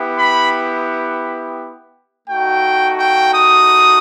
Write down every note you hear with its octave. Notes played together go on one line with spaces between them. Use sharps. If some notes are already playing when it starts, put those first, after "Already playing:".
Already playing: B3 E4 G4
B5
A3 D#4 F#4 G5
G5
D#6